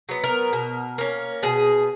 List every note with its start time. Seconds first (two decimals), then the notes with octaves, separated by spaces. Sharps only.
0.09 F#3 B3
0.24 A#4
0.53 B2
0.98 A#3 C#4
1.43 B2 G#4